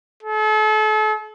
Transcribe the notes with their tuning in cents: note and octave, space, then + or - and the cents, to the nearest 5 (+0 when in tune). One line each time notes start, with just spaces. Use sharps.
A4 -40